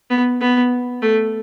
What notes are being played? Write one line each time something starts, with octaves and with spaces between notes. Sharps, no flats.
B3
B3
A3